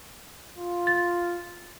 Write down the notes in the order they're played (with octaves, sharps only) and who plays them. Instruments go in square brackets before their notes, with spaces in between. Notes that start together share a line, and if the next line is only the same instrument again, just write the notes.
[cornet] F4
[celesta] A6